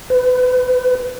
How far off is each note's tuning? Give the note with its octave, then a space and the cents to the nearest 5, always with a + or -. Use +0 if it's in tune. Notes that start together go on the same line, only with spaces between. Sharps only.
B4 +30